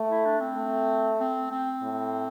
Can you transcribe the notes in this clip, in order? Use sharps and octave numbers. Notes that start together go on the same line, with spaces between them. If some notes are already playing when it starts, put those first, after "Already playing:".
Already playing: A3
E4
D4
C4
A3
C4
C4
A2